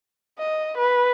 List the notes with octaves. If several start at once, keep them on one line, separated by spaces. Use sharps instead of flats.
D#5
B4